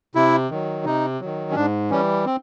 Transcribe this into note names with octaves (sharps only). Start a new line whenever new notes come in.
C3 E4
D#3 F#3
C3 D#4
D#3 F#3
C#4
G#2 D4
E3 G3 C#4
C4